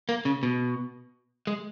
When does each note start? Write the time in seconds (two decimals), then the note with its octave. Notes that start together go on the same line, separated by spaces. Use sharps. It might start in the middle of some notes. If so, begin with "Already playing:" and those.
0.09 A#3
0.25 C#3
0.43 B2
1.47 G#3